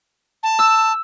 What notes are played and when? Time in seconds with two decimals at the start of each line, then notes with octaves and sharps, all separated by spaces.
0.43 A5
0.59 E6